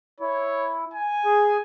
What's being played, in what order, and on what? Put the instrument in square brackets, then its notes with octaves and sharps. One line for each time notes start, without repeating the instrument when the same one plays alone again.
[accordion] E4 [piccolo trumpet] C#5
[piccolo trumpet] G#5
[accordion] G#4